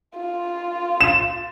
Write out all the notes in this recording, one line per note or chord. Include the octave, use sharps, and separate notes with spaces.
F4
E7